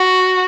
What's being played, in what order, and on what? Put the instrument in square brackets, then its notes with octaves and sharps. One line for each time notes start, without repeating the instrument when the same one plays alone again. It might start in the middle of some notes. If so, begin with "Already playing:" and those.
Already playing: [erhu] F#4